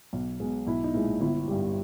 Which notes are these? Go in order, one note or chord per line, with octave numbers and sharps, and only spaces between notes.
B1
B2 G#3
B1 E4
D#4
A#2 G#3 E4
G1 E4
G2 G3